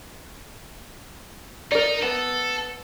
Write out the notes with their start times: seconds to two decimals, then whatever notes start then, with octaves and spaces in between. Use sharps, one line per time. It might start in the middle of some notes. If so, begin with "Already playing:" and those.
1.72 D#4 A#4 D5
2.02 B3 A4